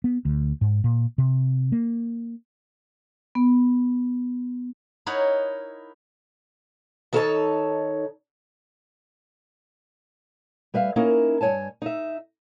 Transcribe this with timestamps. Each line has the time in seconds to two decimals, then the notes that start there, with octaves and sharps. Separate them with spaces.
0.04 B3
0.25 D2
0.61 G#2
0.84 A#2
1.18 C3
1.72 A#3
3.35 B3
5.06 D#4 E4 A#4 C#5 F#5
7.13 D#3 D#4 A4 B4 C#5 A5
10.74 G3 B4 E5 F5
10.96 A#3 C#4 D#4 E4 A#4
11.41 G2 D#3 C#5 G#5 A5
11.82 D#4 E5